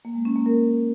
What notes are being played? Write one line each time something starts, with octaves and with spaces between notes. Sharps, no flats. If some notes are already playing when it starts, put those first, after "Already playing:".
A#3
G#3
C#4
A#3
A#4